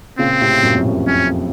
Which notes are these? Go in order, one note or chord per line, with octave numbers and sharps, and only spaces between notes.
A#2 C#3 C4
A2 C3
F#2 A#2
F2
F#2
F2 C#4